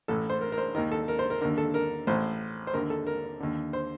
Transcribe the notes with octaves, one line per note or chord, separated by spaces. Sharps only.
A1 A2 A4
C5
A#4
A#4
C5
D#2 D#3 A#4
A4
A#4
C5
A#4
D#2 D3 A#4
A4
A#4
A1 A2 C5
C5
D#2 D3 A#4
A4
A#4
D#2 D3
C5